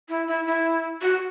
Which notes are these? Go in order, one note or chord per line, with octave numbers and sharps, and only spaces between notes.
E4
E4
E4
F#4